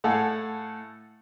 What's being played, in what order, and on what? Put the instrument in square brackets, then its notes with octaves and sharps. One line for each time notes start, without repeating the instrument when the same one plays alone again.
[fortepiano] A2 E4 A4 F5 F#5 G#5